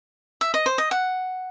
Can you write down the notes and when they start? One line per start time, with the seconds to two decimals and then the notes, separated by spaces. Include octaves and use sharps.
0.41 E5
0.54 D#5
0.66 C5
0.78 D#5
0.91 F#5